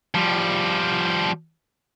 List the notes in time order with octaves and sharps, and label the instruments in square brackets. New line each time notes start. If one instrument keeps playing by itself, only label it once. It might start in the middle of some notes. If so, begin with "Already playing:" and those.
[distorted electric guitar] F3 G3